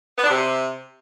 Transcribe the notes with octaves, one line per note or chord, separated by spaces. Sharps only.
B3
D4
C3